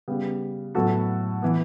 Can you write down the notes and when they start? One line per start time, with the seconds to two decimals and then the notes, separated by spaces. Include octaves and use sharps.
0.08 C#3 G3 B3
0.75 A2 F#3 B3 F#4 A4
1.42 E3 B3